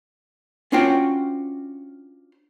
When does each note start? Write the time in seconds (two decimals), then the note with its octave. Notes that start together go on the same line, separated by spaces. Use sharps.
0.72 C#4 D4 F4 F#4 C5 G5